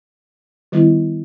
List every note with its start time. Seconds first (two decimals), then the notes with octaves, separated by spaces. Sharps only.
0.72 D#3 G3 B3 E4